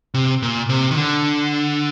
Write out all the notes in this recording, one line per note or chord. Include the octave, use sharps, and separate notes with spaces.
C3
A#2
C3
D#3
D3